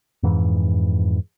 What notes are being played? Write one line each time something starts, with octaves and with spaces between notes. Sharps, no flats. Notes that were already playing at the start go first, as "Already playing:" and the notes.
F2 G#2 E3